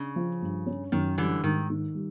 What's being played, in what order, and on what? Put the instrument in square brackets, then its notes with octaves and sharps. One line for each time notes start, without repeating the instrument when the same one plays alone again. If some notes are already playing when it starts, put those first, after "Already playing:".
Already playing: [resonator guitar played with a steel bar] C#3 [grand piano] C#4 D4
[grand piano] F3
G2
C#4
[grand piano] F#2 [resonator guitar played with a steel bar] D#3
[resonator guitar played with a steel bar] D3 E3 [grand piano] G3
[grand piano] G#2 [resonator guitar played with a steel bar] D#3
[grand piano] D#3
G3